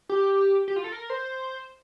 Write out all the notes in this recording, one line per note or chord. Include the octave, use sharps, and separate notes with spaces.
G4
G4
F4
A4
A#4
C5